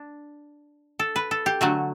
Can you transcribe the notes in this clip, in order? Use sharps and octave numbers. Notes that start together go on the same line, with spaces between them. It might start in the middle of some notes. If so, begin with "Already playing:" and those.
Already playing: D4
A4
B4
A4
G4
D3 F#3 A3 F#4